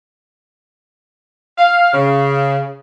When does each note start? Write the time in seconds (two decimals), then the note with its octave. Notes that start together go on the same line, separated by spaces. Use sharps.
1.57 F5
1.93 C#3